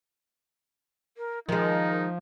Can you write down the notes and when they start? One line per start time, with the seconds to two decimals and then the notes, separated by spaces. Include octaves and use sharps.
1.17 A#4
1.49 D#3 F3 G#3 D#4 A#4